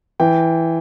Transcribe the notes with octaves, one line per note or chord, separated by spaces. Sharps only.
E3 G5